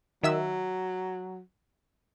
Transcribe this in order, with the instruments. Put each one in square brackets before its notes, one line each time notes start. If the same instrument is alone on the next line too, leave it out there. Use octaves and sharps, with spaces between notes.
[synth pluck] D#3 E5 E6 [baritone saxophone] F#3